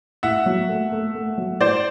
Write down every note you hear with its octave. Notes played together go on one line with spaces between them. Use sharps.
A2 E5 F#5
F#3
A3
A3
A3
F#3
A2 C5 D5